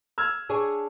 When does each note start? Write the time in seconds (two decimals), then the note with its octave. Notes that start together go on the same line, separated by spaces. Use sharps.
0.18 E6 F6 G#6
0.49 D4 G#4 C#5